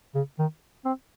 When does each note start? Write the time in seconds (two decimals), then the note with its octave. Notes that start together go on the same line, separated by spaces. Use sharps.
0.15 C#3
0.39 D#3
0.85 C4